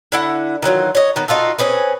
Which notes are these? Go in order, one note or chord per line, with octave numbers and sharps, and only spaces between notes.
D3 E4 F#5
D#3 E3 F#3 F4
C#5 D#5
D#3 B3
D#4 F4 F#4 A4
C4 C#4 G#4 B4